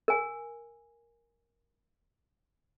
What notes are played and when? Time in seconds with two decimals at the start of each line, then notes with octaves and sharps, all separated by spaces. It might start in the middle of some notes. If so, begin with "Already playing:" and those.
0.08 A#4 G#5